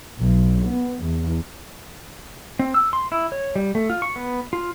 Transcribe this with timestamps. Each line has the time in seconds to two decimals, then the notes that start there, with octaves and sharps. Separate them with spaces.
0.19 B1
0.66 B3
1.03 E2
2.59 C4
2.74 E6
2.93 C6
3.12 E4
3.32 C#5
3.56 G3
3.75 A3
3.90 F4
4.02 C#6
4.16 B3
4.53 F4